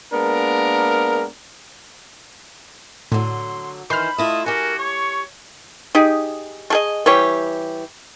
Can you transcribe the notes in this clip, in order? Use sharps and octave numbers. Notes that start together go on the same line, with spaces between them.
G#3 A#3 B3 D4 A#4
A2 D3 F#3 C6
D#3 E3 C5 B5 C6 F6
A3 E4 F4 D#5
F#4 G4 A#4 G#5
C#5 C#6
D#4 G4 G#4
A3 G#4 D#5
E3 G3 G4 C#5